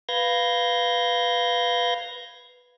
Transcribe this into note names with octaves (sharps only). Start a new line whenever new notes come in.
B4 F5 G6 G#6 A#6